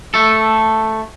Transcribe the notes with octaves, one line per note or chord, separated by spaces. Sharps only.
A3 A4